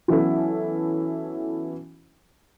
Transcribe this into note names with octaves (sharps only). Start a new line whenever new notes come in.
E3 F#3 B3 C#4 E4 A4